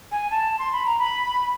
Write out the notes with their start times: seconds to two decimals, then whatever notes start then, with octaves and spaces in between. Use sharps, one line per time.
0.12 G#5
0.31 A5
0.59 C6
0.73 B5
0.86 A#5
0.99 B5